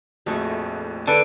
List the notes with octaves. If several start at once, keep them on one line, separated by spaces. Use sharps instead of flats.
A#1 F2 A2 G#3 A3 F#4
D3 B4 D5 A5